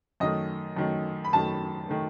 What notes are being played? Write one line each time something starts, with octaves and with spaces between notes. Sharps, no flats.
F#2 D#3 A3 D#5
F#2 D#3 A3
B5
F#2 D#3 A3 A5
D#3 A3